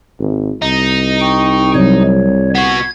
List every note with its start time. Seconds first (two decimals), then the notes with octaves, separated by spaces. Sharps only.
0.19 G#1
0.62 C2 D#4
1.20 G5 C#6
1.75 C3 F#3 G3 C#5
2.55 B3 F#4 G#6 C7